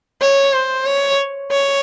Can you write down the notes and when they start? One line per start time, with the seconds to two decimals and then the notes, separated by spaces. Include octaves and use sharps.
0.21 C#5
0.54 C5
0.86 C#5
1.51 C#5